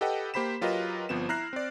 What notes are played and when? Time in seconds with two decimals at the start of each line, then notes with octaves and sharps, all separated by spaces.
0.01 G4 A4 B4 D#5 F#5 G5
0.34 A#3 G4 C5 B5 B6 E7
0.61 F#3 F4 G4 A#4 B4 D#5
1.09 G1 F3 B3 C4 E7
1.29 E4 A#5 F6 F#6 A#6 C7
1.53 C4 D5